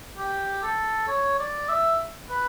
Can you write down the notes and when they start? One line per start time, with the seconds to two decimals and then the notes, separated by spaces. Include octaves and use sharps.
0.18 G4
0.63 A4
1.08 C#5
1.39 D5
1.69 E5
2.30 B4